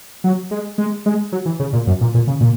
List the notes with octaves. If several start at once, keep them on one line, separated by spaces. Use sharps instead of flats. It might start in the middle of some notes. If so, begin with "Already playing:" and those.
F#3
G#3
G#3
G#3
F#3
E3
C#3
A#2
F#2
A#2
A#2
C#3
A#2